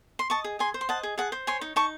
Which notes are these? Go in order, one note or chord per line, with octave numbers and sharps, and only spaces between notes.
C6
D#5 A5 C#6
G#4
G#4 G#5 C6
C5
C6
D#5 F#5 A5
G#4
G#4 F#5 A5
C5
C#5 G#5 C6
D#4
D#4 A5 C#6